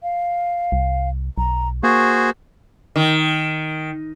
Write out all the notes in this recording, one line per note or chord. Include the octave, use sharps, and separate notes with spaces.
F5
C2
B1 A#5
A#3 F#4 G#4 C5 C#6
D#3